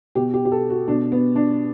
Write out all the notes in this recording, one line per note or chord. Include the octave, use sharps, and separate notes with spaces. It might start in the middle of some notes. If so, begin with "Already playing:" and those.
B2 G4
G4
G4
A4
F#4
B2 D4
B3
D4